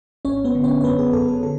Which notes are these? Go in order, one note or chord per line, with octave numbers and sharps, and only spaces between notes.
G#1 C#4 C#5
B3 B4
D3
C#4 C#5
C#5
F#2 B3 B4
G#4
F#2 A4
A4
D3 A4